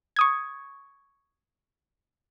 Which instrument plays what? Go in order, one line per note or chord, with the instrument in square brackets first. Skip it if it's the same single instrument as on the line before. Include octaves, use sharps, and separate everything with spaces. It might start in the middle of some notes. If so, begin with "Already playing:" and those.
[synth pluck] C#6 D#6 G#6